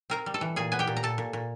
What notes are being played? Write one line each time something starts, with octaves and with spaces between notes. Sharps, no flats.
C4 A#4 A#5
G3
A4 A5
E3
A#2 G#4 G#5
B3 G#5
G4 G5
A#2
A#5
A#2 A4 A5
A#2
A#2